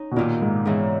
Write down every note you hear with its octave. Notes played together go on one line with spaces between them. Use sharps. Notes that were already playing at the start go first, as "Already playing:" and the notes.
Already playing: C#4 D#4
B2
D#2 A#2 D#3 A#3
G#2
E2 G#2 C#3 E3